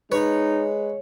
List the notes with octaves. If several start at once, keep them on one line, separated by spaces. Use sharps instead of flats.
G#3 D#4 B4 C#5